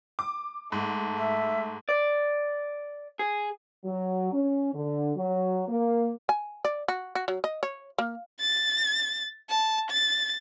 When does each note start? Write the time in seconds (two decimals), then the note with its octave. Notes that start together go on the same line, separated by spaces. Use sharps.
0.19 D6
0.72 G#2 A3
1.18 E5
1.89 D5
3.19 G#4
3.85 F#3
4.33 C#4
4.74 D3
5.16 F#3
5.69 A#3
6.29 G#5
6.65 D5
6.88 F#4
7.15 F#4
7.28 F#3
7.44 D#5
7.63 C#5
7.98 A#3
8.41 A6
9.50 A5
9.91 A6